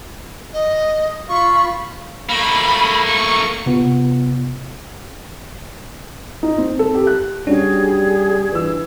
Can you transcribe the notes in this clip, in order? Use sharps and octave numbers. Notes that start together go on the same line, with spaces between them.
D#5
F4 B5 C#6
A3 A#3 B5
C#6
C3 B3 F4
D#4
C4
A4
G4
F#6
G3 C#4 D4 F#4 G#4
E3 E6